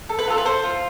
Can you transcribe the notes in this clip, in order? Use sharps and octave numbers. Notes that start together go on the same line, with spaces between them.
A4
B4
F4 A4
B4
A4 C5
F4